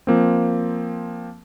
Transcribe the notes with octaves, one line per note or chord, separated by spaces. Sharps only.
F3 A#3 C4